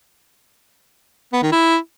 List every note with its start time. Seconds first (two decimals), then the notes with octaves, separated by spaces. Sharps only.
1.33 B3
1.43 D#3
1.52 E4